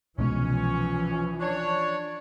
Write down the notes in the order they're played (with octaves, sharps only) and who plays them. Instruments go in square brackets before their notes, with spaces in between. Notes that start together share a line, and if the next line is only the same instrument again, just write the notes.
[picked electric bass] C2 B2 G#3 [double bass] E3 F3 [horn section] C#4
[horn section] D4 C#5